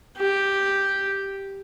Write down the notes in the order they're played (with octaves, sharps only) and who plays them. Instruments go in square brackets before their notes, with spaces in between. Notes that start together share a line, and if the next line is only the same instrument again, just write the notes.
[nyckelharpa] G4